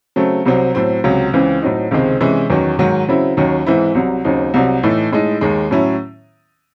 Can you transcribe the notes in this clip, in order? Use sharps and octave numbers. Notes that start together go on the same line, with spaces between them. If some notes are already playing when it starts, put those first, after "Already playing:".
C#3 F#3 A3 C4
C2 C3 F#3 C4
A2 F#3 C4
C#2 C3 F#3
C#2 C#3 E3 C4
A2 F#3 C4 D#4
C#2 C3 D#3 G#3 C4
C3 E3 G#3 C#4 E4
E2 D#3 F#3 C#4
G#2 D#3 F#3
C#3 F#3 C4 E4
D#2 D#3 F#3 C#4
G#2 E3 C4 E4
C2 C3 F#3
D#2 C#3 F#3 C4 D#4
C2 C3 F#3
A2 E3 A3 D#4
A2 G#3 D#4
D#2 D#3 G#3
A2 F#3 C#4 E4